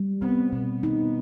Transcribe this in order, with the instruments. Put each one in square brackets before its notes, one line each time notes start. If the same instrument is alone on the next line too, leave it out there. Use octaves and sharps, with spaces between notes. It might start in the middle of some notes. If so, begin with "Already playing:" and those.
Already playing: [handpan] G3
[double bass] B3 [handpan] C4
[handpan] B2 [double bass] B3
[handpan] D#4